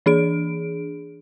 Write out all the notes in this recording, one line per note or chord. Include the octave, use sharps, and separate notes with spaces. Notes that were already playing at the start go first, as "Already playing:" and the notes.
E3 D4 G#4 D7